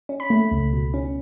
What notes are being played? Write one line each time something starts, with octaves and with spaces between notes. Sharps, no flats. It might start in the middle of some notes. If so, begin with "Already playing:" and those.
C#4
B5
A3
C#2
B2
C#4